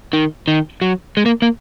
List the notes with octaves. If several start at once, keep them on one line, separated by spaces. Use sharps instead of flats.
D#3
D#3
F#3
G#3
A#3
A#3